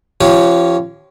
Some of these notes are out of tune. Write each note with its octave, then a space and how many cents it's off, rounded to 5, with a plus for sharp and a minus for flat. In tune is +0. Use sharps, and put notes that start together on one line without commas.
F3 -30 C#4 +0 G4 -35